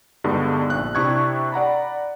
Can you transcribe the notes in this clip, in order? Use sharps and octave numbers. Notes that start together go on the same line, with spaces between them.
G2 D3 G3 G#3 B3 D#4
A#1 F#6
C3 D4 E4 C#6 D#6 G#6
D5 F#5 A#5 B5